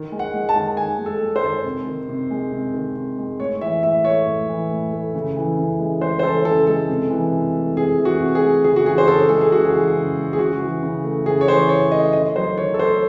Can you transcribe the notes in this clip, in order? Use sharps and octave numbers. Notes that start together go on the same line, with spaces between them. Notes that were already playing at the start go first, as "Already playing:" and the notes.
Already playing: D#3
G#3
F#5
G#3
A5
D#3
D#3 G#5
G#3
A4
G#3
C5
D#3
C3
D#3
C3
G#3
C3
D#3
C3
G#3
A2 C#5
E3 E5
A2 E5
A3 C#5
A2
E3
A2
A3
C#3
E3
C#3
G#3
C#3 C5
C5
E3 A4
C#3 A4
G#3 A4
C3
E3
C3
A3
C3 G#4
E3
F#4
C3
G#4
A3
C#3 G#4
F#4
E3 G#4
C5
C#3 A4
G#3 A4
G#4
C#3 F#4
G#4
E3
C#3
G#3
G#4
C#3 F#4
E3
C#3
A3
C#3 G#4
C#5
E3 C5
C#3 C#5
A3 D#5
D#3 D#5
F#3 C5
D#3 C#5
A4
A3 C5